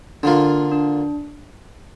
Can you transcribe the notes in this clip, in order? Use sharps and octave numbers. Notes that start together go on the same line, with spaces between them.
D3 F3 A#3 D4 F4
D4